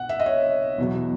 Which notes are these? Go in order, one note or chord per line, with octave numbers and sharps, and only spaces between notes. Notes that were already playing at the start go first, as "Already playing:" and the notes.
Already playing: B1 B2 F#5
E5
D#5
C#5
E2 B2 F#3